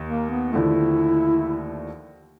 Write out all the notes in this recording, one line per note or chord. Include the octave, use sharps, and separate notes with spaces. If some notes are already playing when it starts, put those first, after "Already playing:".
Already playing: D#2
A#3
B3
D#2 D3 F3 A3 E4